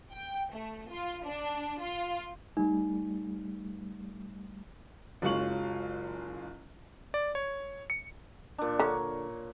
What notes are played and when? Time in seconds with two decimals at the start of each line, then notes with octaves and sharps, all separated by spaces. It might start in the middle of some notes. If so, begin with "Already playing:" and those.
0.13 G5
0.53 A3
0.90 F4
1.26 D4
1.81 F4
2.57 G3 A3 D#4
5.22 F#1 F#3 G#3 F4 C#6 F#7
7.14 D5
7.35 C#5
7.90 C#7
8.58 A#2 D4
8.79 D3 A#4 C#5